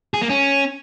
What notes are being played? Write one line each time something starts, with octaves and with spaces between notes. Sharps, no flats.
G#4
A#3
C#4